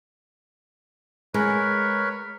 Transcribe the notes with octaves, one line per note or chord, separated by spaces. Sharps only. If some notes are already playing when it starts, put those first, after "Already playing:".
G#3 A#4 B4 C#5